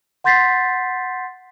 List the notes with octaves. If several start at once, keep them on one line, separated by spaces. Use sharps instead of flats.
F#5 C6 G6 A6 B6 C7